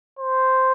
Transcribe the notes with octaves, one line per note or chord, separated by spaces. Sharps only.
C5